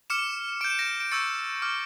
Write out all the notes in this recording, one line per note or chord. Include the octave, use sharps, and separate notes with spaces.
D6 F6 C#7 E7
D6 G6 D7
E7
A#6 D7
D7
C#6 E6 G6 A6 C#7
D6 F6